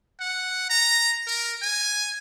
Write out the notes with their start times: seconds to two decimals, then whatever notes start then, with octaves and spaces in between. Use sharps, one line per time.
0.20 F#5
0.70 A#5
1.27 A#4
1.62 G#5